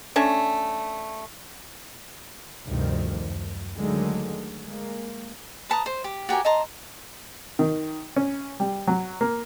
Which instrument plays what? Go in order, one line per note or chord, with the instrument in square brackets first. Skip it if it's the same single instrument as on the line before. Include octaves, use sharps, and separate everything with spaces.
[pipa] A3 C#4 D4
[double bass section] D2 G2 C3 D#3 F3 G3
F#2
D3 D#3 F#3 G#3 A3
G#3 A#3
[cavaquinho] B4 A5 A#5 D#6
C5
G4
F#4 G4 A#4 G#5
D#5 A5 A#5 C6
[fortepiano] D#3
C#4
G3
F#3
A#3